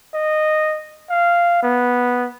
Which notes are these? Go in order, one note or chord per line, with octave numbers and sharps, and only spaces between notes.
D#5
F5
B3